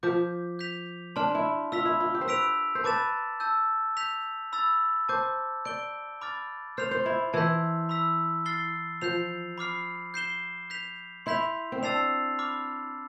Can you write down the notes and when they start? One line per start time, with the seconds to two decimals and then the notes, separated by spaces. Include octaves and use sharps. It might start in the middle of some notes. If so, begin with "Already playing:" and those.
0.03 F3 D6 G6 B6
0.59 G6 B6 F7
1.16 D4 A5 C6 F6
1.35 E4
1.72 F4 E6 B6 F7
1.85 E4
2.00 F4
2.14 G4
2.21 C5
2.28 B4 E6 B6 D7 F7
2.75 C5
2.84 B4 A5 D6 A6 E7
3.40 A5 E6 G6
3.97 G6 B6 F7
4.53 B5 E6 A6
5.09 C5 A5 D6 G6
5.65 D5 G6 D7 G7
6.21 B5 D6 F6 A6
6.77 C5 F6 C7 F7
6.91 C5
7.06 E4
7.33 E3 A5 C6 E6 G6 B6
7.89 B5 E6 B6
8.46 F6 A6 C7 G7
9.02 F3 G6 C7 F7
9.58 B5 D6 F6 C7
10.14 G6 C7 E7 G7
10.70 G6 B6 F7
11.26 E4 C6 G6 B6 F7
11.72 C4
11.82 D4 A5 E6 A6 C7 F7
12.39 B5 D6 F6